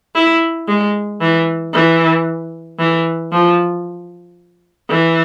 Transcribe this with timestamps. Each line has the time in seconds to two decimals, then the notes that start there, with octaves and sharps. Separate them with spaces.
0.15 E4
0.68 G#3
1.21 E3
1.74 E3
2.79 E3
3.32 F3
4.90 E3